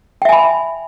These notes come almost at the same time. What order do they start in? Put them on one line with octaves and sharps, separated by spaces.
G5 E5 G#5 B5